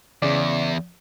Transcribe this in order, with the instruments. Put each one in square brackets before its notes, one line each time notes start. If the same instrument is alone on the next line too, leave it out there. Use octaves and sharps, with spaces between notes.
[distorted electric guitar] E2 [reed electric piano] C#3 D5